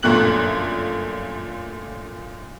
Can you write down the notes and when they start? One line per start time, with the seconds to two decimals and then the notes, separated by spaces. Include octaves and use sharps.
0.03 G1 F#2 A#2 A3 F#6 F#7